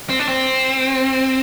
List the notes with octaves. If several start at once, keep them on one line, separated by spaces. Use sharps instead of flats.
C4
D4
C4